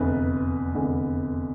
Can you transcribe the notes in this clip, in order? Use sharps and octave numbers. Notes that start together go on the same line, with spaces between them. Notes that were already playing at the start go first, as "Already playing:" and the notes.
Already playing: F1 E2 D3 B4
F1 E2 D3